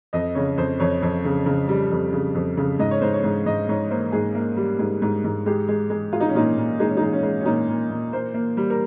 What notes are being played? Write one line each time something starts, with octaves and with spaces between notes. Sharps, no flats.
F2 D#5
C#3 C#5
F2 C5
F2 C#5
F2
C#3
C#3
G3
F2
C#3
F2
C#3
G#2 D#5
C#5
G#2 C5
C#5
G#2
G#2 D#5
G#2 C#5
A#3 C5
G#2 G#4
A#3
G3
G#2
G#2
G#2
G#3 G4
G#3
G#3
G#3 F4
D#4
C#4
A#2 D#4
A#2
G#3 D#4
C#4
G#3 D#4
C#4
G#3
C#4
A#2 D#4
A#2
A#2
A#3 C5
A#3
G3
A#4